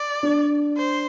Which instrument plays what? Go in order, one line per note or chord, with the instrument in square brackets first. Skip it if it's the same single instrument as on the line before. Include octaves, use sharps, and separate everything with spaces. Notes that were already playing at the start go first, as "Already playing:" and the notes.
Already playing: [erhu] D5
[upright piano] D4
[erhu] C5